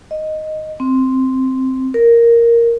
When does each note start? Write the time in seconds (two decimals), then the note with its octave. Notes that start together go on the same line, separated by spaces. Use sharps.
0.11 D#5
0.80 C4
1.94 A#4